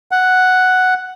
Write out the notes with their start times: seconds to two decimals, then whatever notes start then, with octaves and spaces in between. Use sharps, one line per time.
0.11 F#5